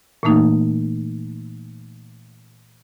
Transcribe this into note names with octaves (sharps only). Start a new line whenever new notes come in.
A#2 E3 A3 A#3 D#4